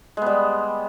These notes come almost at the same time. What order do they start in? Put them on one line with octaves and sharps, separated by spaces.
G#3 B3 G3